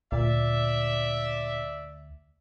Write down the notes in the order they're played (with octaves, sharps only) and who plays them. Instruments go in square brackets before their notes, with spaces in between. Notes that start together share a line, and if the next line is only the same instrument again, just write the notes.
[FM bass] D2 [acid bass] A#2 [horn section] D5 E5